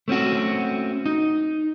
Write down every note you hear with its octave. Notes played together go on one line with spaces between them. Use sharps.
A3 C4 C#4 F#4
D#4